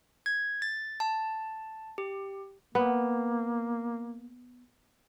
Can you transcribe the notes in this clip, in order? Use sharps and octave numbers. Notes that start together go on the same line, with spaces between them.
G#6
A6
A5
G4
A#3 B3